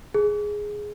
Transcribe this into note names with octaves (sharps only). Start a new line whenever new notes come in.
G#4